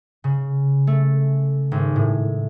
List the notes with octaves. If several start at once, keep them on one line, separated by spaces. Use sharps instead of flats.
C#3
A3
G#1
A2